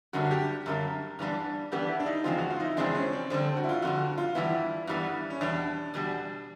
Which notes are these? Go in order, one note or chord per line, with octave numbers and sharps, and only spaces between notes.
F#2 D3 G3 A#3 F#4
G4
F#2 D3 G3 A#3
G2 E3 G3 B3 D4
G2 E3 G3 B3 D4 G4
E4
D4
D#4
E2 C#3 F3 G#3 C4 F4
F#4
F4
D#4
E4
E2 C#3 F3 G#3 C4 D4
C#4
C4
F2 D3 G3 C4
F#4
E4
F4
F2 D3 G3 F#4
F4
G2 E3 G3 B3 E4
G2 E3 G3 B3
C#4
E2 B2 G3 D4
E2 B2 G3